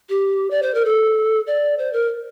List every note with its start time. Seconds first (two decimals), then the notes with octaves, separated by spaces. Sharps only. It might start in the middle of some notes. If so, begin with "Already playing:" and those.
0.09 G4
0.51 D5
0.62 C5
0.74 A#4
0.85 A4
1.47 D5
1.78 C5
1.93 A#4